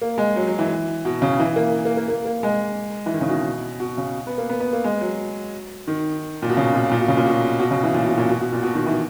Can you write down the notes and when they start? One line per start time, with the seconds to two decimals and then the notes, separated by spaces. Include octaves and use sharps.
0.01 A#3
0.18 G#3
0.36 F#3
0.47 F#3
0.59 E3
1.05 B2
1.22 C#3
1.40 E3
1.56 A#3
1.85 A#3
1.97 A#3
2.08 A#3
2.25 A#3
2.43 G#3
3.06 E3
3.14 D#3
3.21 C#3
3.29 B2
3.80 B2
3.97 C#3
4.27 B3
4.38 A#3
4.49 B3
4.60 B3
4.73 A#3
4.84 G#3
5.01 F#3
5.87 D#3
6.42 A#2
6.49 B2
6.57 C#3
6.73 A#2
6.91 A#2
6.99 B2
7.08 C#3
7.17 A#2
7.25 B2
7.60 B2
7.71 C#3
7.83 E3
7.94 A#2
8.06 B2
8.17 A#2
8.29 B2
8.40 B2
8.52 A#2
8.63 B2
8.75 D#3
8.87 E3